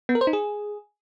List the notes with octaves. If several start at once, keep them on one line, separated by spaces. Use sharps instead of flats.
B3
A#4
C5
D#4
G#4